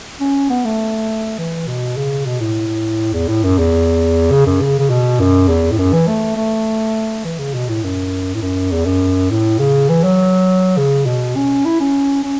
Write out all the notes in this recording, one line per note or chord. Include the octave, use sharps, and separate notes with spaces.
C#4
B3
A3
E3
B2
C#3
B2
A2
E2
A2
F#2
E2
C#3
F#2
C#3
C#3
B2
F#2
E2
A2
F#2
E3
A3
A3
E3
C#3
B2
A2
F#2
A2
F#2
E2
F#2
A2
C#3
E3
F#3
C#3
B2
C#4
E4
C#4
C#4